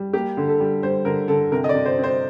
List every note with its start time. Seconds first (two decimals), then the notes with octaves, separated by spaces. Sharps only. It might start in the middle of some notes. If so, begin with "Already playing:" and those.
Already playing: G3
0.13 A#3 G4
0.37 D3
0.48 A4
0.60 G3
0.83 G3 C5
1.05 D3 A#4
1.28 D3 A4
1.52 C3 A#4
1.64 D#5
1.69 D5
1.74 C3
1.85 C5
1.98 C4
2.04 C5